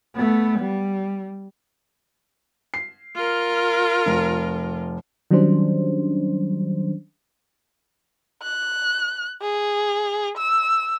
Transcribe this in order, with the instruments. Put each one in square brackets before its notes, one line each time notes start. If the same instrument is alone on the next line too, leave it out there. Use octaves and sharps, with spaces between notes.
[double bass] A3 B3
G3
[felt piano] C7
[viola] F4 A#4
[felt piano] F1
[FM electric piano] D#3 F#3 G3 C#4 D4 C5
[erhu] F#6
G#4
E6